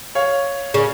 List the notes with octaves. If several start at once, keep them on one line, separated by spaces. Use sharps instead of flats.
C#5 F5
C#3